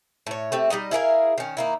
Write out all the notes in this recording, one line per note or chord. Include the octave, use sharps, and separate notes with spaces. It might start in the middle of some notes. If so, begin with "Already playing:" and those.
A2 C#5
A3 C4 G4
G3 G#3 D#4 D#5
E4 G#4 A#4 F5
D#3 C#4
D#3 A#3 E4